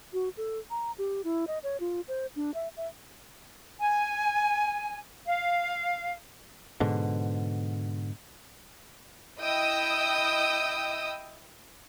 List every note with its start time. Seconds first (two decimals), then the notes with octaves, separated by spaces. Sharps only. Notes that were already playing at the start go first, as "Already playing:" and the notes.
0.13 F#4
0.37 A4
0.70 A#5
0.98 G4
1.24 E4
1.47 D#5
1.63 C#5
1.80 F4
2.08 C5
2.36 D4
2.54 E5
2.77 E5
3.80 G#5
5.25 F5
6.80 G#2 B2 D3
9.40 E4 D#5 G5 D#6 E6